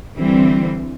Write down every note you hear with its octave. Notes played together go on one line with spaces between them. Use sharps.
D3 E3 G3 C4